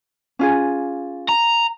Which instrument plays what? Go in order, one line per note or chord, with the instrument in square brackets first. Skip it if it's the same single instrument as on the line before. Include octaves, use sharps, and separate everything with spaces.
[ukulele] C#4 F4 G#4
[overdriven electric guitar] A#5